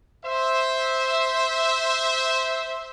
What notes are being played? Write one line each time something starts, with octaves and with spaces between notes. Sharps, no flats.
C5 E5